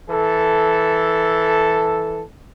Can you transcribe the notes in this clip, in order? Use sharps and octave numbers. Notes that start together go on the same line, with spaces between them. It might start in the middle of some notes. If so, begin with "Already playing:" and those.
E3 A4